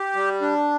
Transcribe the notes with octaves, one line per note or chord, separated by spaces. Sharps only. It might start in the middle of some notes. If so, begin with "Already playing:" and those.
Already playing: G4
G3
D4